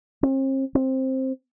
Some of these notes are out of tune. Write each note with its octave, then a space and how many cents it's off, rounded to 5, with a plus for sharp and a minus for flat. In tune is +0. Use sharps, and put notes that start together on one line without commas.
C4 +40
C4 +10